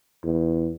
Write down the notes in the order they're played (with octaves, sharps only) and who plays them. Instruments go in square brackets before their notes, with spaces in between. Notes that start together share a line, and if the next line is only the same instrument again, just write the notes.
[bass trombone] E2